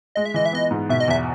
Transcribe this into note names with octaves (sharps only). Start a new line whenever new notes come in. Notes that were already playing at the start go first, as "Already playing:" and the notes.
G#3 D#5
E5
E3 D#5
E5
B3 D#5
G#2
B2 E5
D#5
E2 E5